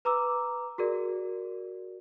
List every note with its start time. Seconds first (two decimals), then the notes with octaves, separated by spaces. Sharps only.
0.05 B4 A#5 D6 E6
0.78 F#4 G#4 A#4 D5